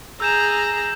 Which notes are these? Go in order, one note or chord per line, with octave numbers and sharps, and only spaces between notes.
G#4 A#5 E6 G6 E7